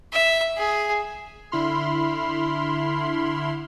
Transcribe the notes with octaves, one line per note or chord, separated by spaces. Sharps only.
E5
G#4
D3 E4 B5 C6 F6